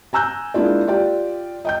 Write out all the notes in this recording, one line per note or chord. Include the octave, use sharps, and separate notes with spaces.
G#5 A#5 E6 F#6 G6
G#3 A#3 D4 E4 F4 D5
F4 G4 D5 G5
D#5 G5 G6